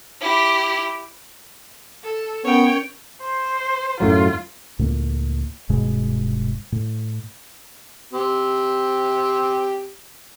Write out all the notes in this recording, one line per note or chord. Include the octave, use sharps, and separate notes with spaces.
E4 G4
A4
B3 C#4 A#4 C#5 G5
C5
F#2 A2 F#3 F4
C#2 A2 G#3 A#3
D#1 G2 B2 G#3
A2
C4 G4